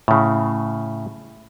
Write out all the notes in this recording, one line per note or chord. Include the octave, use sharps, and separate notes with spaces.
A2 C#3